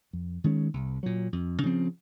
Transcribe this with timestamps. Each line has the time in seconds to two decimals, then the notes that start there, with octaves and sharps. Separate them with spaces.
0.13 F2
0.44 D#3 G#3 C#4
0.74 C2
1.03 A#2 F#3
1.33 F2
1.63 C#3 F3 C4